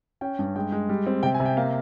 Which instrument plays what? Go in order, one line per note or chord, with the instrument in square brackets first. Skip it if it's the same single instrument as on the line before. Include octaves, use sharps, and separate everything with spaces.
[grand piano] C#4 G5
G2
G#3 G5
G#3
G3
C4
C3 G5
G#5
C3
G5
A#3 F5